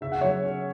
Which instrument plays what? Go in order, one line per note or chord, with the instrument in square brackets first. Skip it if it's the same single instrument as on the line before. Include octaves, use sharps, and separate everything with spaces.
[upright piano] C#3 E5
F#5
F#3 C#5 E5
C#4